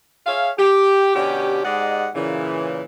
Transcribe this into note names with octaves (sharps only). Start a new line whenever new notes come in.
G#4 C#5 E5 F5
G4
B2 D3 C#4 G4
G#2 G#3 G4 D5 D#5 F#5
A#2 C#3 E3